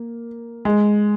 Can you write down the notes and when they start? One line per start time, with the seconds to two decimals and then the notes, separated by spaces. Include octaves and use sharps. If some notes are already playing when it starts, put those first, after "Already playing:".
Already playing: A#3
0.65 G#3